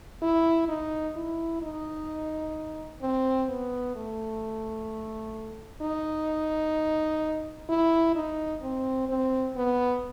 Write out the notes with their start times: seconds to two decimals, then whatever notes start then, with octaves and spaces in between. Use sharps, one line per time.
0.22 E4
0.68 D#4
1.16 E4
1.62 D#4
3.02 C4
3.49 B3
3.95 A3
5.82 D#4
7.69 E4
8.15 D#4
8.62 C4
9.09 C4
9.56 B3